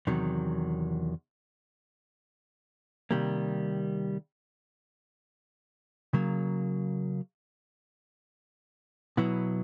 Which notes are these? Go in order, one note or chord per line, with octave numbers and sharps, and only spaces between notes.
E2 C3 D#3 F#3
C3 D#3 G3 A#3
C#3 F#3 A#3
B2 F#3 B3 E4